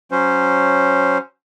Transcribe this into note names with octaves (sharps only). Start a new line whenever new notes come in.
F#3 C#4 C5